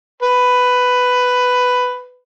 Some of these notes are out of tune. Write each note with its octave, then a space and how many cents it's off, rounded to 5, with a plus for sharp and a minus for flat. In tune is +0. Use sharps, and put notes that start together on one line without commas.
B4 +10